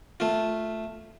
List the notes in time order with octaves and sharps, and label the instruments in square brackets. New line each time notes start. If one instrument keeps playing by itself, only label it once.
[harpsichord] A3 F4